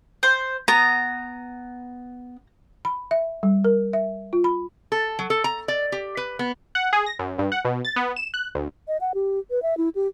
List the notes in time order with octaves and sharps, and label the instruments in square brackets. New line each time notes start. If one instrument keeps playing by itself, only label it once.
[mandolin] C5
[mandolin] B3 [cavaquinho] A#5
[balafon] B5
E5
G3
A#4
E5
F4
B5
[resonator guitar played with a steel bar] A4
F#3
A4
A#5
D5
G4
B4
B3
[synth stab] F#5
G#4
A#6
F#2
G2
F#5
B2
A6
B3
E7
F#6
D2
[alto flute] D#5
F#5
G4
B4
E5
E4
G4